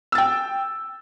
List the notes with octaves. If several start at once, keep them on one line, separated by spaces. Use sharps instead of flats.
G5 E6 A6